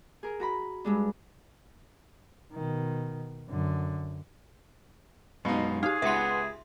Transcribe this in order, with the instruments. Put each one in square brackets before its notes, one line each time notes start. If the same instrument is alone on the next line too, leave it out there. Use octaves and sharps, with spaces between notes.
[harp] G#4 A#4
F#4 A#5 B5
G2 G#3 D4
[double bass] B2 D#3
F#2 D3
[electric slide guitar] F#2 G#3 F5 [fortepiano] B2 D#4
[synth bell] D#4 G4 [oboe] G#4 [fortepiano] F5
[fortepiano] C#2 [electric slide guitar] B4 F#5 [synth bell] E5 C6